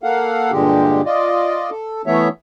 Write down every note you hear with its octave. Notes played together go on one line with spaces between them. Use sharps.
A#3 A4 F5 F#5
G2 A#2 D3 G#3 G4
F4 D5 D#5
A4
E3 A3 B3 C#5 E5